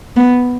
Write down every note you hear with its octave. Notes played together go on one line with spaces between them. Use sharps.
B3